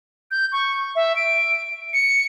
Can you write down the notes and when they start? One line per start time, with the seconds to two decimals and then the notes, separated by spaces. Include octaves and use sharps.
0.31 G6
0.52 C#6
0.96 E5
1.16 D7
1.93 C#7